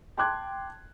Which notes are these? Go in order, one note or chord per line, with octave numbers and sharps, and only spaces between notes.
G5 A5 C6 D6 F#6 G#6